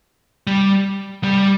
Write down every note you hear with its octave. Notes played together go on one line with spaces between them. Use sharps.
G3
G3